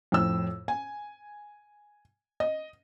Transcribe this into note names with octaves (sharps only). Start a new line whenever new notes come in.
F2 A2 E6
G#5
D#5